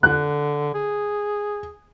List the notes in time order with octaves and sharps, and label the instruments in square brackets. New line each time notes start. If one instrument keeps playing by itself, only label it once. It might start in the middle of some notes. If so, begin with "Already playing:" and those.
[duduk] D3 [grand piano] F#6
[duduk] G#4